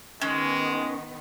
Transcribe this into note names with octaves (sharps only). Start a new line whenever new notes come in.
D#3 G#3 B3 C#4